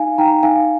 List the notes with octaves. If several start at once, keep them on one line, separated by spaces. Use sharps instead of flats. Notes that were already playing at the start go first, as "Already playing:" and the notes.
Already playing: D#4 F5 G#5
D#4 G5 A#5
D#4 F5 G#5